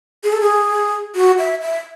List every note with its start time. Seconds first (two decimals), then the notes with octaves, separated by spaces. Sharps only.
0.24 G#4
0.33 A4
0.41 G#4
1.15 F#4
1.39 E5
1.62 E5